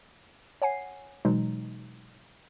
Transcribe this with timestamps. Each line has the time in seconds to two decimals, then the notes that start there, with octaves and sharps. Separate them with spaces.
0.62 C#5 F#5 G#5 C7
1.25 B2 E3 F#3 G#3 D#4